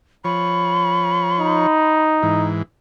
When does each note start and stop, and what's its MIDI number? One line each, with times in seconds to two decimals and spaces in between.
0.25 1.67 53
0.25 1.67 73
0.25 2.03 83
1.40 2.50 63
2.22 2.62 44
2.22 2.62 52